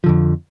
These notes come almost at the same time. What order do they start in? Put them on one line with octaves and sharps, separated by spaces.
F3 D3 F2